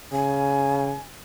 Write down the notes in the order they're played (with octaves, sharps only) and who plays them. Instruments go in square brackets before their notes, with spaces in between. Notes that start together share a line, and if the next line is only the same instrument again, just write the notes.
[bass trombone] C#3 [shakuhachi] G#5